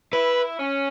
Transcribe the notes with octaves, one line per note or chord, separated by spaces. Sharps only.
E4 B4
C#4